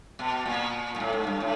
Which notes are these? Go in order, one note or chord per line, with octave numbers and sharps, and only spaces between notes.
B2
A#2
A#2
A2
G#2
G2
A2